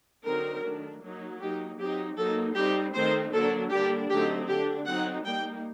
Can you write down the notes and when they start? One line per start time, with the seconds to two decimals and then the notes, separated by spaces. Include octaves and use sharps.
0.25 D3 F#3 C4 D#4 A#4
0.64 D#3 A3 D4
1.02 F#3 A#3 D#4
1.40 F#3 A#3 D#4 G4
1.79 F#3 C4 D#4 G4
2.17 F#3 A#3 D#4 A4
2.56 G3 C4 D#4 G4
2.95 D#3 A3 C4 D#4 C5
3.32 D3 F#3 A#3 D4 A4
3.71 D3 G3 A#3 D4 G4
4.10 D3 F#3 A3 C4 D#4 G4
4.48 D3 A3 D4 G4
4.86 F#3 C4 D#4 F#5
5.25 G3 A#3 D#4 G5